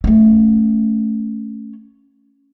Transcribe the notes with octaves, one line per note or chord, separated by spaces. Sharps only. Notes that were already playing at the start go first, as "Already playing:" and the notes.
A3 C#4